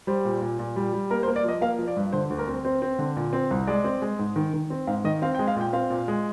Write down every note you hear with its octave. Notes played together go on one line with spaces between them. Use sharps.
G3 C5
A#2
A#2
A#2
G3
G3
A#3 A#4
C5
A#3
D5
F3 D#5
A#3 F5
F3
D5
G2
D3 C5
D2
A#4
C4
C4 C5
C4
D3
A#2
C4
C2
G#3 D5
C4
G#3
G#2
D#3
D#3
C4
G#2 F5
D#3 D#5
C4 F5
G5
G#3
F5
A#2 G5
C4 F5
A#2
G#3